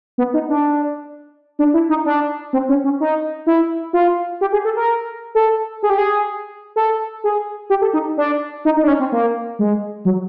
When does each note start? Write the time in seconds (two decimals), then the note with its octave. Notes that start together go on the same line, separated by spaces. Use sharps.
0.18 B3
0.34 D#4
0.49 D4
1.59 D4
1.74 E4
1.89 D#4
2.06 D4
2.53 C4
2.69 C#4
2.84 C#4
3.00 D#4
3.47 E4
3.93 F4
4.41 G4
4.52 G#4
4.65 A4
4.76 A#4
5.35 A4
5.83 G#4
5.90 G4
5.98 G#4
6.76 A4
7.24 G#4
7.70 G4
7.81 A4
7.93 D#4
8.17 D4
8.65 D#4
8.77 D#4
8.83 D4
8.88 C#4
9.00 C4
9.12 A#3
9.59 G#3
10.05 F#3